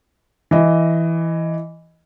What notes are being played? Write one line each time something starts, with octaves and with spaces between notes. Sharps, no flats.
E3 D#5